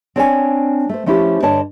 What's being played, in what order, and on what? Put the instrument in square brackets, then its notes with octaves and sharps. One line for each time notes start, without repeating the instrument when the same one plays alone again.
[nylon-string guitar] C4 D4 C#5 D5 F5 G#5
A3 C5
F3 A3 C#4 E4 G4 C5
G2 D3 C#5 D#5 A5